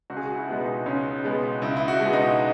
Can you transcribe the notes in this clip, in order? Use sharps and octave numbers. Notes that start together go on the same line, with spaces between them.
C#2 F#4
G#4
F#4
E4
B2 G#3 B3
D#4
C#2 C#4
B2 G#3 B3
C#2 E4
E4
F#4
B2 G#3
D#4